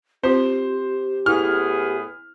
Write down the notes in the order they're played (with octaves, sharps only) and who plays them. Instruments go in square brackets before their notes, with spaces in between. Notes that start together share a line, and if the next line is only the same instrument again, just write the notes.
[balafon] C4 F4 [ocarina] G4 [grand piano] C5
[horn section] A2 B3 G#4 [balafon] E4 [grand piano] F6